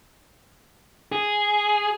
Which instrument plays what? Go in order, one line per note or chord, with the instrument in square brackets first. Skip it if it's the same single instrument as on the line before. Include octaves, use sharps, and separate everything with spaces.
[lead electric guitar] G#4